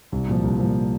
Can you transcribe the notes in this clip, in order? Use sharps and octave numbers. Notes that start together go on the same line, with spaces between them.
C2
A#2 F3
C2
A#2 F3